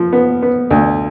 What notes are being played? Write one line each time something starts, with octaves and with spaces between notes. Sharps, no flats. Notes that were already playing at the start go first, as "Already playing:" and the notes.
Already playing: F3
B3
B3
D2